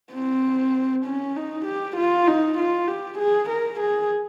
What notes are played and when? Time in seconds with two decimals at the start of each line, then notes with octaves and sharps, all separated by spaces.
0.14 C4
1.05 C#4
1.36 D#4
1.66 G4
1.97 F4
2.27 D#4
2.58 F4
2.88 G4
3.18 G#4
3.50 A#4
3.80 G#4